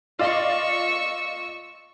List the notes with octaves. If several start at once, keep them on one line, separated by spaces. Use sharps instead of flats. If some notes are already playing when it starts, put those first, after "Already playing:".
F4 D5 D#5 C#6 E6